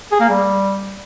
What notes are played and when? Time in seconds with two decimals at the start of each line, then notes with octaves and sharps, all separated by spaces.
0.12 G#4
0.20 A#3
0.29 G3